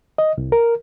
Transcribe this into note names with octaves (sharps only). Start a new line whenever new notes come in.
D#5
C2
A#4